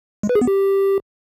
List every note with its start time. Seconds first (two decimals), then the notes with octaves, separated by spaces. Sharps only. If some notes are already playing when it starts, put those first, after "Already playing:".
0.23 G#3
0.29 B4
0.35 G#4
0.41 B3
0.47 G4